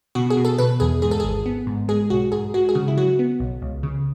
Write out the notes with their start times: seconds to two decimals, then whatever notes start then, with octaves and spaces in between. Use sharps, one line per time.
0.15 B2 F#4
0.30 G#4
0.37 B2
0.45 A4
0.58 B2 B4
0.80 E2 G#4
1.02 G#2 G#4
1.11 A4
1.20 G#1 G#4
1.46 B3
1.67 G#2
1.88 G#3 G#4
2.10 B1 F#4
2.32 G#2 G#4
2.54 G#3 F#4
2.69 G#4
2.75 C#3 F#4
2.88 E4
2.97 F#3 F#4
3.19 B3
3.40 B1
3.62 C#2
3.83 C#3